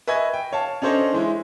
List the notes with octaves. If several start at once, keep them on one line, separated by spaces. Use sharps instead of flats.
B4 D#5 E5 G#5 C#6 G#6
G5
C#5 F5 A5
C#4 D4 A4 C5 C#5 D#5
E3 G#3 E4